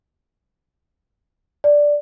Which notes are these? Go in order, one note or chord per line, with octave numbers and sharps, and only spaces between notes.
D5